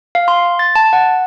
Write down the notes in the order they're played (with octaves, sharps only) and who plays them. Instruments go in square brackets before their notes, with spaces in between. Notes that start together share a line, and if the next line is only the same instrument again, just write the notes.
[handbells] F5
C6
A6
A5
F#5